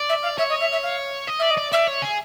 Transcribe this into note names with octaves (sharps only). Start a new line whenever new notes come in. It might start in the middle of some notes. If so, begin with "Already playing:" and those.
Already playing: D5
E5
F5
C#5 E5
D#5
E5
E5
F5
D#5
D5 E5
D#5
D5
D5 E5
C#5
G#4